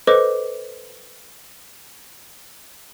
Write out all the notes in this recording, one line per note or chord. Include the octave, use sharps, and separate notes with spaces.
A4 B4 C5 D#5 D6